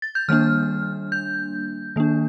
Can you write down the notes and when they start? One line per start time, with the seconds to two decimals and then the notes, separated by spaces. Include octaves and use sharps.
0.02 A6
0.15 G6
0.28 D#3 G3 A#3 D4 F6
1.12 G6
1.96 D#3 A#3 D4